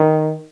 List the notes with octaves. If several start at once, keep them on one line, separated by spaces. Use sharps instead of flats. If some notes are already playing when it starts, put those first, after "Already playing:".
Already playing: D#3